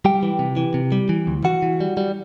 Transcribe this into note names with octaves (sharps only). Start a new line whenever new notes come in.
G3 G4 G5
E3
C3
E3
C3
G3
E3
D2
E3 F#4 F#5
E3
G3
G3